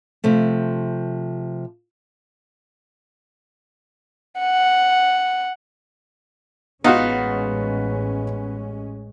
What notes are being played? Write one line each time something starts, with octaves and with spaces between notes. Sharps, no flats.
C3 F3 A3
F#5
A1 G#3 B3 C#4 D#4 F4 F#4